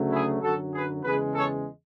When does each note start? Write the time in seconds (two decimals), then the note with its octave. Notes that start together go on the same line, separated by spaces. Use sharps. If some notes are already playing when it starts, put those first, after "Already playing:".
Already playing: D2 C#3 F#3 A3
0.12 E4 G#4
0.42 F#2 D3 F#3 F#4 A4
0.74 G#4 B4
1.04 E2 C#3 G#3 G#4 B4
1.35 A4 C#5